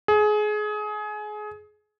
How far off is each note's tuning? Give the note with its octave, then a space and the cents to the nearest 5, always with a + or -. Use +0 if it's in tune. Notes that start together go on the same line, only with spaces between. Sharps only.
G#4 +25